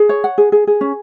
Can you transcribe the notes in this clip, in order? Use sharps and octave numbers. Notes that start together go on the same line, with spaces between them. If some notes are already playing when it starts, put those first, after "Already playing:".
Already playing: G#4
C#5
F#5
G#4
G#4
G#4
C#4